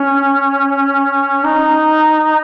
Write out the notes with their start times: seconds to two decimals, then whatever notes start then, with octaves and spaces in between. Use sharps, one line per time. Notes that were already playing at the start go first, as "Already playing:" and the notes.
Already playing: C#4
1.44 D#4